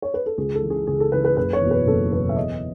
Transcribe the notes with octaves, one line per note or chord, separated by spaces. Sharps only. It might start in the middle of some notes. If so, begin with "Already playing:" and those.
C#5
B4
A4
C#2 G#4
A4
C#3 E3
G#4
C#2 G#4
A4
C#3 E3 B4
B4
F#1 B4
C#5
E2 B2
B4
F#1 A4
E2 B2 B4
E5
E2 D#5